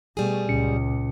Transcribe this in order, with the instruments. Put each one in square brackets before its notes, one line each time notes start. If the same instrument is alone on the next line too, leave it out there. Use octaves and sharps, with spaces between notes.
[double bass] B2 A3 [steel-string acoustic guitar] G3 G#4
[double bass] C#2 [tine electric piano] A#2 C#4 C#7